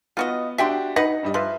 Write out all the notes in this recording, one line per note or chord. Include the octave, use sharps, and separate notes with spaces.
B3 F4 F#4 D#5
D4 F#4 G4 E5 G5 C6
D#4 B4 F#5 A#6
G2 G3 D#5
F3 B4 E5 C6